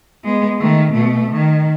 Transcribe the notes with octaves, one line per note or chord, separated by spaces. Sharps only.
G#3 B3
D#3 A3
B2 A3
D#3